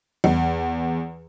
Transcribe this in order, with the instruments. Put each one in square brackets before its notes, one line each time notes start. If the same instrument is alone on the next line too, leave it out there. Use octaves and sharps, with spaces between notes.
[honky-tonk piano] E2